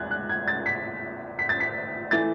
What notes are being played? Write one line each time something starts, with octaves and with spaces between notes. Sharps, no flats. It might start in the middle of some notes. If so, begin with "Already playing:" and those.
Already playing: E2 G#3 F#6 G#6 A6
F#6
G#6
A6
B6
B6
A6
B6
E3 A3 A6